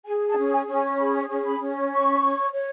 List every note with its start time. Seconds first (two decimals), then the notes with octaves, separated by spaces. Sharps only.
0.06 G#4 G#5
0.28 A5
0.36 C#4
0.52 G#5
0.67 C#4
0.74 G#5
0.98 G#4 B5
1.29 C#4
1.44 B5
1.60 C#4
1.91 C#5 C#6
2.21 C#5
2.53 C#5